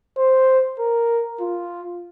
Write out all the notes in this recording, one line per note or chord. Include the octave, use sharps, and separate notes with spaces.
C5
A#4
F4